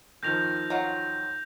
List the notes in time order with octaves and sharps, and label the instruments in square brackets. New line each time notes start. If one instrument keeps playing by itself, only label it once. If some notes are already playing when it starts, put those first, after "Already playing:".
[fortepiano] D#2 D#3 F3 [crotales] G6 A#6 F7
[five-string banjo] F#3 F4 F#5